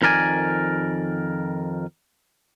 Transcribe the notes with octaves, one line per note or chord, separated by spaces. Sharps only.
F2 D#3 A#4 D5 G#5